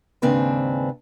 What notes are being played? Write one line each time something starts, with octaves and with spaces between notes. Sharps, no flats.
D#2 G#2 C#3 C4 D4 B4